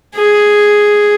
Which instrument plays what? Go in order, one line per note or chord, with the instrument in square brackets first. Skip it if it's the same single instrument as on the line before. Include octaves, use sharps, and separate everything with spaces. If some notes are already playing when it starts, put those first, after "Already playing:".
[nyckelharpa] G#4